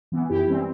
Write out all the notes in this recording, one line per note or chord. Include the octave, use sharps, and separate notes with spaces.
E3 B3
F#2 E4 G4
E3 G3 C4